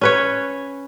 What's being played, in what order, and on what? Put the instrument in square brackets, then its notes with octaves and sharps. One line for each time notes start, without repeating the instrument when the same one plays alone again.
[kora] C#4 B4 C#5